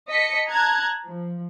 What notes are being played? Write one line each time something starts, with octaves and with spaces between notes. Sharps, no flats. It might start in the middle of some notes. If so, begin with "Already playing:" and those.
D#5 A5 B6 C#7
A5 A#5 F#6 G#6
F3